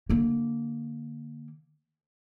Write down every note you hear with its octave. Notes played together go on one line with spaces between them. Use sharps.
D3 A#3